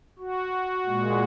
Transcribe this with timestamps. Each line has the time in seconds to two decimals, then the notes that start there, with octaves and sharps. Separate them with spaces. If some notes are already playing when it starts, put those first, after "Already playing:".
0.19 F#4
0.86 A#2 G#3